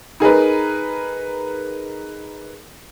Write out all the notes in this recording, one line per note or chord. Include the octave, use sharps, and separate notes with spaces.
D#4 G#4 A#4 B4